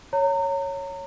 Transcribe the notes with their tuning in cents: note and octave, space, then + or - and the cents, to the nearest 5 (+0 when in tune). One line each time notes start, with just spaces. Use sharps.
C#5 +0 A#5 -30